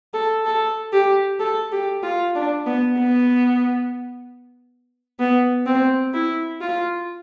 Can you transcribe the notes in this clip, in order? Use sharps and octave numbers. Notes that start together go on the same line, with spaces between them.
A4
A4
G4
A4
G4
F4
D4
B3
B3
B3
C4
E4
F4